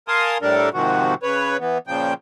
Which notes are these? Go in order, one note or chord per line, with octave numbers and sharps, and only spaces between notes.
A#4 F5 G#5 A5 C6 D#6
A2 G3 D4 A4 A#4
G#2 C3 D#3 F3 F#4
C#3 B4 C#5
E3 B3
A#2 C#3 F3 G5